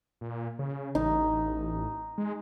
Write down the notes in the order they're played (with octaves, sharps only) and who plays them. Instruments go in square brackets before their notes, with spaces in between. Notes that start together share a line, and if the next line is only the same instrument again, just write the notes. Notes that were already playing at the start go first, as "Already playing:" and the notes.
[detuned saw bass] A#2
C#3
[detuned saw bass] A1 [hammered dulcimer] D#4
[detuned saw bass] G#3